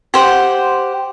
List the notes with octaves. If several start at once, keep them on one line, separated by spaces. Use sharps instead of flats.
G4 C5 F#5